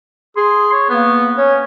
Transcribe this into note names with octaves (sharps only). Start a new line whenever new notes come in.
G#4 C6
C#5
A#3 B3
C#4 C#5